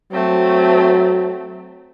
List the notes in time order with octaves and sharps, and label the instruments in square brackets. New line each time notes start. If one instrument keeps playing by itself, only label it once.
[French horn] F#3 [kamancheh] A3 C4